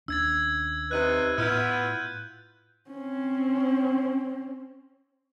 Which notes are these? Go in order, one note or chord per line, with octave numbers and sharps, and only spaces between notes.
D#2 C#4 D4 E6 G#6 A6
C3 D#4 B4 F#6 D#7
A2 B3 E4 F4 E6 G6
C4 C#4